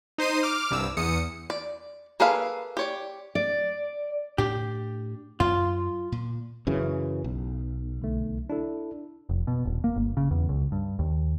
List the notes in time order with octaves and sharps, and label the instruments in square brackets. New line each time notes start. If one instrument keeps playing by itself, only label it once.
[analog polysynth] D#4 C5 C7 D#7
D6 F6
C2 G2 E6
E2 D#6 C#7
[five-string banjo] D5
A#3 G#4 A4 B4 F5
G4 C#5 D5
[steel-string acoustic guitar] D5
[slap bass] A2 D4 [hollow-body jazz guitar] G4
[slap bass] F#2 [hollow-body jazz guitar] F4
[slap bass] A#2
[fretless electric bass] F#2 C#3 E3
B1
[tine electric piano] C2 D3 A3
D4 E4 A4
[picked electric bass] F1
B2
D#1
A#3
G1
C#3
E2
C#2
G2
D#2